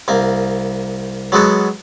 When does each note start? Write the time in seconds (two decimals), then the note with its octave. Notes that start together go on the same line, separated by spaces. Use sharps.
0.08 C2 A#3
1.32 F#3 G#3 B3 A4